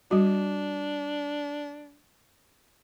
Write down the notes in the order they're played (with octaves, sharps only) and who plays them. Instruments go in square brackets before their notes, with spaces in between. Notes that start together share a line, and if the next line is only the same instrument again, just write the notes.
[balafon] G3 F#4 [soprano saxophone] D4